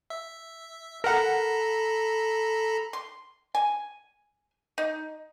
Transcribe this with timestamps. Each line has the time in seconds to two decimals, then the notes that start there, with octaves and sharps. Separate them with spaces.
0.10 E5
1.04 A4 A#4 F#5 A#5 B5
2.93 C6
3.55 G#5
4.78 D#4